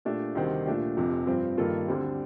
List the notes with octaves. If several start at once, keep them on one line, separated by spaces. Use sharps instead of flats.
A#2 A3 D4 G4
D2 C3 D#3 G3 C4
A#2 A3 D4 G4
F1 F2 C3 F3
G2 F3 C4
G2 D#3 A#3 F4 A4
D2 D3 G3 C4